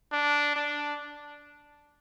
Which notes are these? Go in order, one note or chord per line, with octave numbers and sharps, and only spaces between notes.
D4
D4